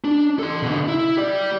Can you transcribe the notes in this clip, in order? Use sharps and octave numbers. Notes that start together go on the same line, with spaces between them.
D4
A4 C6
B2 D3
E4
G4 D5